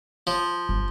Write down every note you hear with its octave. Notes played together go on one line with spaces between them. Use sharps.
F3
G1